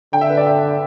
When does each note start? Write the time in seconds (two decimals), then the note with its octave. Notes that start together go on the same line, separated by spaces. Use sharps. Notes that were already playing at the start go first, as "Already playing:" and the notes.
0.13 D3 G5
0.21 E5
0.30 B4
0.37 D5
0.46 E5